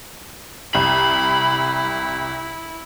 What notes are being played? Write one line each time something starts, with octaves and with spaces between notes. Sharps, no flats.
C2 E4 B5